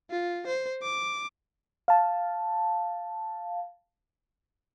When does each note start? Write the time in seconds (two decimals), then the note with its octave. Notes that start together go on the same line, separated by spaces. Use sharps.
0.10 F4
0.47 C5
0.82 D6
1.88 F5 A5